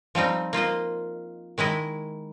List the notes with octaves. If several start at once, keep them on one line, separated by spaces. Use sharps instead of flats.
F3 G3 C4 D#4
A#3 F4 C5 D#5
D#3 G#3 E4 D#5